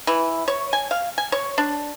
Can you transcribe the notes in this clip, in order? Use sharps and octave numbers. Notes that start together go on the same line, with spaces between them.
E3
C#5
G#5
F5
G#5
C#5
D4